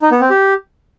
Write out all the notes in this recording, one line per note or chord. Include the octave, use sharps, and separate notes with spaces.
D#4
B3
C4
G4